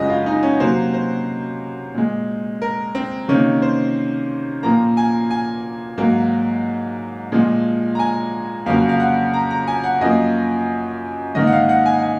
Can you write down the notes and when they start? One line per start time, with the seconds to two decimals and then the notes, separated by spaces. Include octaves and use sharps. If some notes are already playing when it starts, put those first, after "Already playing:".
Already playing: F#2 C#3 F3 G#3 D#5
0.10 F4
0.26 D#4
0.43 C#4
0.60 C3 F#3 A#3 C5
0.94 C5
1.94 A#2 G#3
2.62 A#4
2.95 C4
3.28 C3 D#3 A#3 C#4
3.62 C5
4.63 A#2 F3 A#3 A#5
4.97 G#5
5.31 G#5
5.98 G#2 F#3 A#3
7.32 A#2 F3 G#3
7.95 A#5
7.99 G#5
8.66 F2 C#3 F#3 A#3 F5
8.89 F5
9.00 F#5
9.34 A#5
9.50 A#5
9.67 G#5
9.84 F#5
10.01 F#2 F3 A#3 D#5
11.35 G#2 D#3 A#3 D#5
11.47 F#5
11.52 F5
11.69 F#5
11.86 G#5
12.03 G#5